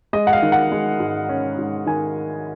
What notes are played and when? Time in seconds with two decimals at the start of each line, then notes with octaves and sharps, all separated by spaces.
0.13 G#3 D#5
0.27 F#5
0.33 F5
0.42 D#3
0.52 F#5
0.72 G#3
1.00 G#2
1.29 C#4
1.58 G#2
1.86 D#3 G#5